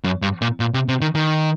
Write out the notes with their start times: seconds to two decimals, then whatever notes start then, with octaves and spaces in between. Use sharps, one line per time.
0.04 F#2
0.22 G2
0.42 A#2
0.60 A#2
0.74 C3
0.88 C3
1.01 D#3
1.15 D#3